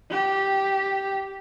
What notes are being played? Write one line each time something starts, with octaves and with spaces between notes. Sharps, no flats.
G4